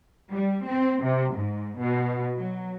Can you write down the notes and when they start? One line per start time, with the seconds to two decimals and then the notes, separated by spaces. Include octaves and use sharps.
0.32 G3
0.66 C4
1.03 C3
1.36 G#2
1.79 B2
2.37 F#3